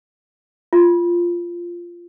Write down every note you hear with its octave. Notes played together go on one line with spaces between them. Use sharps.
F4